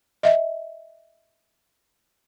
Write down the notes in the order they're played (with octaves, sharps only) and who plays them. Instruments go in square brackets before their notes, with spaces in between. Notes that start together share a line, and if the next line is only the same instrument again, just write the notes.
[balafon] D#5 E5